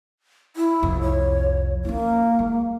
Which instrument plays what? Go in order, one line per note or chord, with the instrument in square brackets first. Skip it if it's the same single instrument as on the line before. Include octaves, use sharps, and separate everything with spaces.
[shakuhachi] E4
[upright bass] C2 F2
[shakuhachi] C#5
[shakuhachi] A#3 [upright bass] C#4 E4
[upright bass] G#3